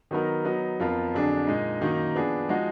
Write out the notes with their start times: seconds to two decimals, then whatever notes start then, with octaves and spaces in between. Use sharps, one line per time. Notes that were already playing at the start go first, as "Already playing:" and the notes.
0.11 D#3 F#3 B3 D#4 A#4
0.45 F#3 B3 D#4
0.80 F2 F3 B3 F4 A#4
1.14 F2 D3 F#3 D4 G#4
1.47 A#2 G#3 D#4
1.81 F#2 D#3 F#3 A#3 D#4
2.15 F3 B3 D4 G#4
2.49 F3 G#3 D#4 F#4